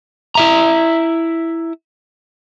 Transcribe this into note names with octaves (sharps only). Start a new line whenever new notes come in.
E4 E5 A#5